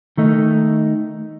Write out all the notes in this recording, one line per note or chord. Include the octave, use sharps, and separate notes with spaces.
D#3 A3 D#4